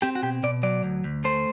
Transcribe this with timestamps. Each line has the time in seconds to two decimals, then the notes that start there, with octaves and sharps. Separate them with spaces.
0.02 C4 G4
0.15 F#4
0.23 B2 G4
0.43 B2 D5
0.63 F#3 D5
0.83 D2
1.04 D2
1.24 A3 C5